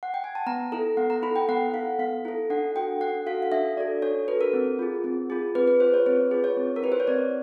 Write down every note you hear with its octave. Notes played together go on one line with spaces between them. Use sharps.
F#5
G5
G#5
A5
B3 A#5
E4 A4 A#5
B3 F#5
A#5
E4 A4 B5
G5
B3 F#5
E4 A4 F5
B3 F5
E4 A4
D4 F#5
F#4 A4 G5
D4 F#5
F#4 A4 F5
F5
D4 E5
F#4 A4 D5
D4 C#5
F#4 A4 B4
A#4
C4
F4 G#4
C4
F4 G#4
C4 B4
B4
F4 G#4 C5
C#5
C4 B4
F4 G#4 B4
C#5
C4
A#4
E4 G4 B4
C5
C#5
C4 D5